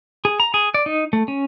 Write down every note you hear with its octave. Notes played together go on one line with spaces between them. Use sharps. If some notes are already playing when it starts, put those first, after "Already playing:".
G#4
A#5
G#4
D5
D#4
A3
C#4